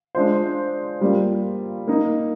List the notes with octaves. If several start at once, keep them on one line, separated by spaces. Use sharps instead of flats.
G#3 D4 F4 C5
G3 A#3 F4
A#3 D#4